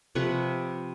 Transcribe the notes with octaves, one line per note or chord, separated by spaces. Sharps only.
C3 F3 B4 C#6